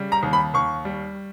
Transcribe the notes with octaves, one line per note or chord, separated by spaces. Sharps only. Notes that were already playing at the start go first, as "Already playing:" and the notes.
Already playing: C#3 G3
A#5
D#2
B5
D#2 C#6
G3